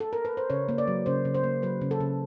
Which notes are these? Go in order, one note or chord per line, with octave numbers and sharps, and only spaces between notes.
A4
A#4
B4
C5
C#3 C#5
A#3
D5
F#3
C#3 C5
C#3
C5
A#3
F#3 B4
C#3
A4
C#3